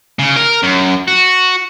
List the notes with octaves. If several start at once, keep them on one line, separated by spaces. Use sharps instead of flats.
C#3
A#4
F#2
F#4